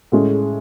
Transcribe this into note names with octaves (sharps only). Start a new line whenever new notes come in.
A2 G#3 C#4